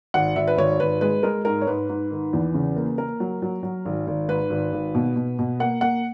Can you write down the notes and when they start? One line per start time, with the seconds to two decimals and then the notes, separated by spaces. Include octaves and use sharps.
0.14 G#1 F#5
0.36 G#1 E5
0.48 B4
0.58 G#1 C#5
0.80 G#1 B4
1.01 G#3 B4
1.23 G#3 A#4
1.45 G#2 A#4
1.62 C#5
1.67 G#2 B4
1.89 G#2
2.11 D#3
2.33 E2
2.54 C#3
2.76 A#3
2.98 A#3 A#4
3.20 F#3
3.42 F#3
3.63 F#3
3.85 G#1
4.07 G#1
4.28 G#2 B4
4.50 G#1
4.72 G#1
4.95 B2
5.16 B2
5.39 B2
5.60 A#3 F#5
5.81 A#3 F#5